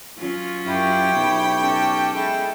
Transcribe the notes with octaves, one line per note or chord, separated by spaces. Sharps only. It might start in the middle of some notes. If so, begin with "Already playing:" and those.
F#3 C#4 F4
F#2 E4 G4 C#5 G5
B1
C#4 A4
G#3 E4 G5